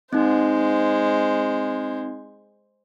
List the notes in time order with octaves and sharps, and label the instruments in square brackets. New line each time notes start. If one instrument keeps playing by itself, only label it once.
[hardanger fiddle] G#3 C5 [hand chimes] C4 D#4